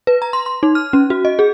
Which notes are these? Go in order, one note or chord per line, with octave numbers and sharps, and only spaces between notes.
B4
A#5
C6
C6
D#4
F6
C#4
F#4
D#5
G#4